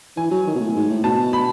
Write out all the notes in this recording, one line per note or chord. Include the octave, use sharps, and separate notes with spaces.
E3 G#5
F#3
D#3
B2
A2
G#2
A2
B2 A5
B5